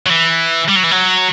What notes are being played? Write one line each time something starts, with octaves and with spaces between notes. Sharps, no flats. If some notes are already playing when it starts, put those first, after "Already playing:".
F#3
E3
G3
F#3
E3
F#3